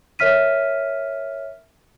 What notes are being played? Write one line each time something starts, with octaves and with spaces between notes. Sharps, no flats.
A#4 C#5 E5 F6 B6 D#7